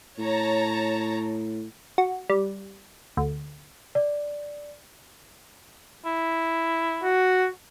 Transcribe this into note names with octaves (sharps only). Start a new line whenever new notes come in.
A2 C#5 A5 A#5
F#4
G3
D2
D5
E4
F#4